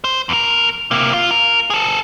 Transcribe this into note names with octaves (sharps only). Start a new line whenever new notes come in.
C5
E2 A#4
C3 A#3
F4
A#4
G#4 A4